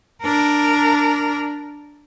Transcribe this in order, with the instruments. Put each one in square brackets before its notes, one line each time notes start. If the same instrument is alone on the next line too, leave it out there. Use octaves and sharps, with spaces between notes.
[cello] D4 A#4